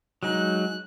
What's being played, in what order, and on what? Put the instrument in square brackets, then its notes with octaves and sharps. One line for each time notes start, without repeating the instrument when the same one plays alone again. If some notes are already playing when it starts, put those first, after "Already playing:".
[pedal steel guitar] F#3 G#3 D#4 [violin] F#6